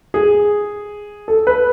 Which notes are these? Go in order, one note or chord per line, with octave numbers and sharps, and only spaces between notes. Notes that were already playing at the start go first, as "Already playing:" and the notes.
G#4
A4
B4